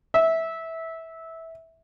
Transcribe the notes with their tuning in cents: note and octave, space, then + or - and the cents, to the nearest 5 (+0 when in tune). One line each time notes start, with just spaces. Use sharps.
E5 -15